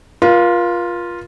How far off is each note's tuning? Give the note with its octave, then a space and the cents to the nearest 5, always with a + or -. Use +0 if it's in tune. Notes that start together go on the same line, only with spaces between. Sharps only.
F4 +0 A#4 +45